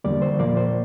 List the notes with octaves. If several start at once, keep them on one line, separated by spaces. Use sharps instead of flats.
E2 D3 G3 A#3 D5
C5
A#2 F3 A#3 D5
C5